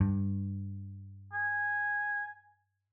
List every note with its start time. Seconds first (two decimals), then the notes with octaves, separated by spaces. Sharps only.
0.01 G2
1.33 G#5